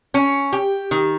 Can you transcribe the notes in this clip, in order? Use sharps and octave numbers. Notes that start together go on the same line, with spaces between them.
C#4
G4
D#3